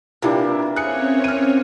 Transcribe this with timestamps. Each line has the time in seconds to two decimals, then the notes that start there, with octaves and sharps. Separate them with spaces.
0.22 C3 E3 A#3 D4 E4 F4 G4
0.76 C4 C#4 G#4 C#5 F#6 C#7
1.24 F6 D#7